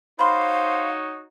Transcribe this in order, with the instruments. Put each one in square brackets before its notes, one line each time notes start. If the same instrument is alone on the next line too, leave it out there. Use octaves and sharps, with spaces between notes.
[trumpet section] D#4 F#4 C#5 [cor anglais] C5 [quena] F5 [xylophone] B5 C6